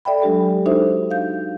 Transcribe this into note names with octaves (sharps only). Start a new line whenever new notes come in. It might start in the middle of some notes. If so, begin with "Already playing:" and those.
A4 D5 E5 G5 B5
F#3 G#3 D4 G4 A4
D4 D#4 F#4 A4 C5 E5
F5 G6